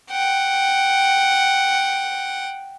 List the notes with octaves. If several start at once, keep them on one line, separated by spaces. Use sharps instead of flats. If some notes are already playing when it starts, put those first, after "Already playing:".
F#5 G5